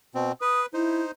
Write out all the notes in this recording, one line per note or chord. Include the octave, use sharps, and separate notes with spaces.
B2 C4
B4 D#6
D#4 E4 C5